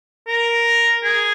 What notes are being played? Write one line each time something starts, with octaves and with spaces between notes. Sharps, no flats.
A#4
G#4